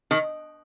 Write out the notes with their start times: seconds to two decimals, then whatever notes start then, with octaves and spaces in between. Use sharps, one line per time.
0.11 D#3